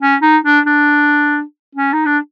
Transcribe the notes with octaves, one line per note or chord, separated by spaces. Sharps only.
C#4
D#4
D4
D4
C#4
D#4
D4